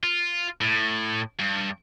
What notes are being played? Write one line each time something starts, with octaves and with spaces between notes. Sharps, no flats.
F4
A2
G2